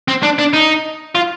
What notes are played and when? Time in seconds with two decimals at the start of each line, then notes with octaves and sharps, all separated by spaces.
0.08 C4
0.23 D4
0.39 D4
0.54 D#4
1.15 F4